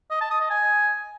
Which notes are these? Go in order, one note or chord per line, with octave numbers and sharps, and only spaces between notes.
D#5
A5
D#6
D#5
G#5